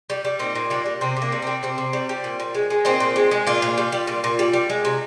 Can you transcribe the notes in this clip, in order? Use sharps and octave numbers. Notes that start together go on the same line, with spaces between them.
G3
G3
A#2 C4 D#4
A#2
G3 A#3 D4
G3
C3 C4
C3
A#3 D4
G3
G3 C4
C3 C4
C3
G3
G3
A#2
A#2
G#3
G#3
A#2 C4 D#4
A#2
G#3
G#3
A#2 D4 F4
A#2
G3
G3
A#2
A#2
G3
G3
G#3
C3